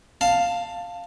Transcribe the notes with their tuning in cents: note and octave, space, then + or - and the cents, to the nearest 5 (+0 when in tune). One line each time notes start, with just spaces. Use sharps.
F5 +0 A5 +15